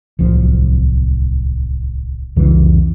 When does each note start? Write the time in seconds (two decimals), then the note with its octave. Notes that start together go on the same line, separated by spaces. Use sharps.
0.19 D1 C2 F3
2.36 C2 F2 C#3 E3